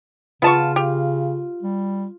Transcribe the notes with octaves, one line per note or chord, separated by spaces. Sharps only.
C#3 B3 F4 A5 C#6
G4
G3